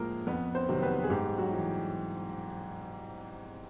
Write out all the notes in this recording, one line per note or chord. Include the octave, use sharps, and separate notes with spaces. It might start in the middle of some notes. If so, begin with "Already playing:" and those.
Already playing: A2 F3 G#3 A#3 A#4
F2 B3 B4
C4 C5
C3 D#3 F#3
B3 B4
G#4
G#2 G3 G4
F#3 F#4
E3 G3